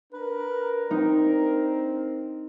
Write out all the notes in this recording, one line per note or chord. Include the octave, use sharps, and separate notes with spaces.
D4 A#4 B4
C4 D#4